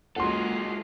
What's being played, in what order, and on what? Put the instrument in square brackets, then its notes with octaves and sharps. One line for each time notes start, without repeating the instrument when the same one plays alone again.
[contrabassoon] F#1 [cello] G#3 F4 [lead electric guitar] F#4 A4 [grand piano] F#5 C6